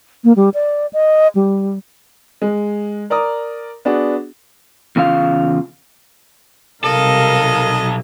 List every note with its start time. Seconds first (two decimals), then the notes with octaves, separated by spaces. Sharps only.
0.24 A#3
0.36 G3
0.54 D5
0.93 D#5
1.35 G3
2.42 G#3
3.10 A#4 D5 A#5 D#6
3.85 B3 D4 F#4 G#4
4.96 E2 C#3 F4 A4 F5
6.84 B1 C3 G3 A4 A#4 D#5 F5